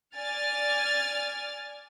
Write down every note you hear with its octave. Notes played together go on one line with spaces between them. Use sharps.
D5 G#5 F6 A6